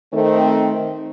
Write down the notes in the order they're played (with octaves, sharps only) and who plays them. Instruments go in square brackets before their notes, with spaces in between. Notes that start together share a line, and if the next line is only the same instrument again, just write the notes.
[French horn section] D#3 A3 C4